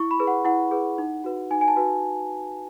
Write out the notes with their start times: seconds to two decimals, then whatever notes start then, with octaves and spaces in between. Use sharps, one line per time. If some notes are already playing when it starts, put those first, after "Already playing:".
Already playing: E4 C#6
0.11 B5
0.19 G#4 B4
0.27 F#5
0.45 E4 F#5
0.71 G#4 B4
0.98 D#4
1.24 F#4 B4
1.51 D#4 G#5
1.61 G#5
1.68 A5
1.76 F#4 B4